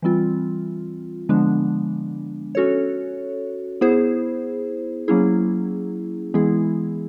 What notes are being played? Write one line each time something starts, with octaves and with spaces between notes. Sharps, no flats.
E3 G3 C4 F4
D3 F3 G#3 B3 D4
C#4 F#4 A4 C#5
B3 E4 G#4 C5
F#3 A#3 C#4 E4 G#4
E3 G#3 B3 E4 G#4